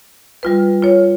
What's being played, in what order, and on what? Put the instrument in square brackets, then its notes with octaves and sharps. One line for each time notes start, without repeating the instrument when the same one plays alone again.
[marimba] G3 F4 B4
F4 C#5